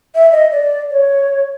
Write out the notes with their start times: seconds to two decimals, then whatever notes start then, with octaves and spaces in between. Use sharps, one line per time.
0.15 E5
0.32 D#5
0.52 D5
0.91 C#5